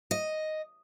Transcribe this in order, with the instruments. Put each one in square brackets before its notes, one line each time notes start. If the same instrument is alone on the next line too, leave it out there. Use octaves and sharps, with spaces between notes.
[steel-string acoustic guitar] D#5